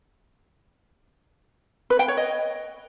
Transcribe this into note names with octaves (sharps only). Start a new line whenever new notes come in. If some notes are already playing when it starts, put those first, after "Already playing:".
B4
G5
C#5
D#5